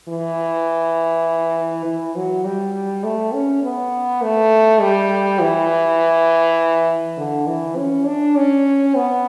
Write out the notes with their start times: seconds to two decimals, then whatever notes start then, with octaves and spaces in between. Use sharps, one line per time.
0.09 E3
1.86 E3
2.16 F#3
2.44 G3
3.04 A3
3.34 C#4
3.63 B3
4.22 A3
4.81 G3
5.40 E3
7.18 D3
7.47 E3
7.77 C#4
8.06 D4
8.36 C#4
8.95 B3